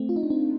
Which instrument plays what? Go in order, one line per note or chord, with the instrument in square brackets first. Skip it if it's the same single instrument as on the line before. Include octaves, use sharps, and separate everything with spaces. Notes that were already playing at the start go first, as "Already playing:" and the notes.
Already playing: [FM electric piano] A3 C4
F4
D#4
D4
C4 D#4